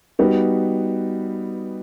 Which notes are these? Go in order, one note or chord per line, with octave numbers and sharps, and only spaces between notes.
G3 B3 D#4 F#4